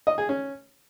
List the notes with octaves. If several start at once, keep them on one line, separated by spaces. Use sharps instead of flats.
D#5
G#4
C#4